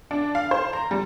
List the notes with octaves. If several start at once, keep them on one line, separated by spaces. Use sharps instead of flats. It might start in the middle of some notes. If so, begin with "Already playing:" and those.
D4
F5
C5
A#5
G3